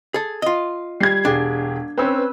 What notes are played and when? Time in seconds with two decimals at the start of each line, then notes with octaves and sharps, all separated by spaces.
0.14 G#4 A4
0.42 F4 D#5
1.00 G3 G#6 C7
1.25 E1 D4 G4 G#4
1.98 C4 C#4 B4 E6